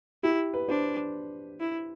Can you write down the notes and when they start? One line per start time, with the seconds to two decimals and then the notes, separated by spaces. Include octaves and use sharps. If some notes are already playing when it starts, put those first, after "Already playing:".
0.23 E4 G4
0.54 B4
0.68 D4 C5
1.60 E4